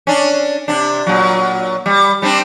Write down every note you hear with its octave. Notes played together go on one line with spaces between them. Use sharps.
C#4 D4
C3 D4
A#2 F#3
G3
G3 C4 D4